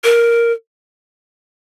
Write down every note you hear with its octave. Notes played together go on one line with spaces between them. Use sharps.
A#4